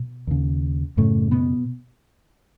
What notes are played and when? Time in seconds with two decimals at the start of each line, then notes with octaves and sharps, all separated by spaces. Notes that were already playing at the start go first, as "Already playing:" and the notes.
Already playing: B2
0.27 D#2 C#3
0.97 F#2 A2 C#3 A3
1.31 B2 B3